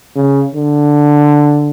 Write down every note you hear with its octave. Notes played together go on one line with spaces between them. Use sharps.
C#3
D3